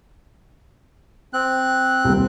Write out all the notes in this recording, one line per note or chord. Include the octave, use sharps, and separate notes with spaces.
C4 F#6
D#1 C2